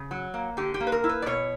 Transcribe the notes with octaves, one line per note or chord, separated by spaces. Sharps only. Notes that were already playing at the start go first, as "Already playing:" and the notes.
Already playing: C#3
F#3
A#3
D3 G4
G4
A#3
B4
A#4
E4
B4
D5
B2 C#5